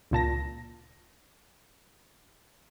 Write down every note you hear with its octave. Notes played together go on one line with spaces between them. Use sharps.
C#2 A#2 A5 A#6